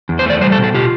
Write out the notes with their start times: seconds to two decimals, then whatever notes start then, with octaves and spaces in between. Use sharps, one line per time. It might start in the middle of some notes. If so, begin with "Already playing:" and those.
0.09 E2
0.19 C5
0.26 A3 D5
0.41 G3 C5
0.52 A4
0.58 B2
0.64 A4
0.74 F4 G4